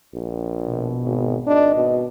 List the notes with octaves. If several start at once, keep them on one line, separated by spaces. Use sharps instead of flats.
A#1
B2
G#1
G#1 D4 D#5
B2